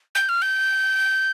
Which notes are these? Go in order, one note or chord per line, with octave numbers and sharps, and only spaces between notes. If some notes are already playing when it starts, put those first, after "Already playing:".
G6
F6
G6